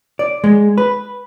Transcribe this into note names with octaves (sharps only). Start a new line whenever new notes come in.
D5
G#3
B4